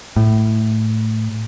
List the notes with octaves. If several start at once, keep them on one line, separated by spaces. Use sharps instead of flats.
A2